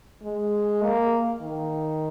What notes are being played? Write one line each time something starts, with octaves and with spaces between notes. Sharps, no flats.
G#3
A#3
D#3